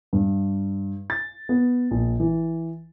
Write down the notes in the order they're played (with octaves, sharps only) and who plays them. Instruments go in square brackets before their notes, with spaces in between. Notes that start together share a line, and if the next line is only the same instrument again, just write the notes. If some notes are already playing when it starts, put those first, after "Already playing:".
[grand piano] G2
A6
B3
A#1
E3